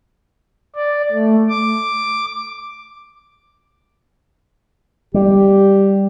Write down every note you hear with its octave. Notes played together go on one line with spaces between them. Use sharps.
D5
A3
D6
G3 G4